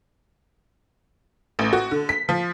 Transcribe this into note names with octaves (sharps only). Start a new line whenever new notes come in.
A1
F#4
D3
B6
F3